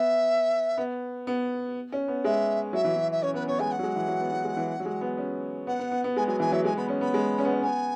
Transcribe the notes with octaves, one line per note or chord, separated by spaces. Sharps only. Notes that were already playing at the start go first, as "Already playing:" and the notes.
Already playing: B3 E5
B3
B3
C#4
B3
G#3 E5
F#3 E5
E3
F#3
E5
C#4 C#5
B3 B4
B3 C#5
G#3 G#5
F#5
F#3
G#3
E3
F#3
B3
F#3
G#3
E3
F#3
G#3
B3
C#4
B3 F#5
B3
B3
B3
G#3 G#5
F#3 G#5
E3 G#5
F#3 E5
G#3 G#5
B3 B5
C#4
B3 B5
G#3
C#4
B3
C#4
B3 G#5